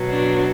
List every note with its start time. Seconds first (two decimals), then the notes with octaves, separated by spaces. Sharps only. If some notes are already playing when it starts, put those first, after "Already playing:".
Already playing: B2 F#3
0.11 D4